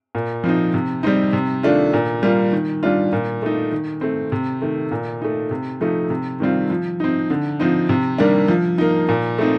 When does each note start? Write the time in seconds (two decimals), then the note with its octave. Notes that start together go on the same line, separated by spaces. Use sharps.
0.15 A#2
0.44 F3 C4 D#4
0.74 C3
1.03 G3 C4 D#4
1.33 C3
1.63 D#3 A3 D4 F4
1.94 A#2
2.23 G3 A#3 F4
2.53 D#3
2.83 G3 D4 F4
3.13 A#2
3.42 A3 D#4
3.72 D#3
4.01 A3 C4
4.32 C3
4.62 D#3 A3
4.91 A#2
5.22 A3 D#4
5.51 C3
5.81 F3 A3 D#4
6.10 C3
6.40 D#3 G3 C4 F4
6.70 F3
7.00 C4 D#4
7.30 D3
7.60 F3 C4 D#4
7.89 C3
8.18 D#3 G3 A#3 D4
8.48 F3
8.78 A#3 D#4
9.09 A#2
9.38 A3 C4 D#4